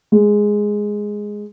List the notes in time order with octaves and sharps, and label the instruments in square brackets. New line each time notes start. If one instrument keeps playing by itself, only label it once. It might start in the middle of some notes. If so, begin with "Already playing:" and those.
[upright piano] G#3